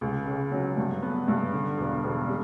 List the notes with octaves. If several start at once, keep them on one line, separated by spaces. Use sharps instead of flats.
C#2
C#3
F#3
G2
B3
G2
D3
E1
E1
G3